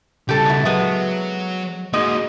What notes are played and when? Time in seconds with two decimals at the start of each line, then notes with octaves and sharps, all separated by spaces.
0.29 C#3 G3 G4 A4
0.46 B2 E4
0.65 F#3 G#3 B3
1.93 G#2 G#3 A#3 F#4 D#5